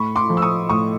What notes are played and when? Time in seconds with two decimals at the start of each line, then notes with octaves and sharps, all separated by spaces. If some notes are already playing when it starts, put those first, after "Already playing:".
Already playing: A2 B5 C#6
0.16 C6 D6
0.29 F3 A3
0.37 E6
0.42 C#6 D#6
0.69 A2 C#6 D#6